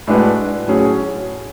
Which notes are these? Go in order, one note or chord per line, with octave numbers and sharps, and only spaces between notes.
A2 G#3 D4 F#4 B4
A2 F#3 C#4 G#4